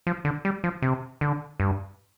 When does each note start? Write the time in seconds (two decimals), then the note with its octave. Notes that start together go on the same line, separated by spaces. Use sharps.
0.07 F3
0.25 D3
0.45 G3
0.64 F3
0.82 C3
1.21 D3
1.60 G2